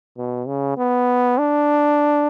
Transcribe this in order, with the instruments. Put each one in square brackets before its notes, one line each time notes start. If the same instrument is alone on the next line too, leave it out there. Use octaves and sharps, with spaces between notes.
[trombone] B2
C#3
B3
D4